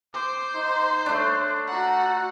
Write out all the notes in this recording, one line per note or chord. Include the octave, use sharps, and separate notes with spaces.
C5 D6
D#4
A3 D4 C#5
F#4 F#5 A#5